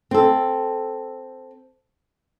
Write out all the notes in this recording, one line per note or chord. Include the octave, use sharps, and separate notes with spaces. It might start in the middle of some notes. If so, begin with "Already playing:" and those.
C4 A4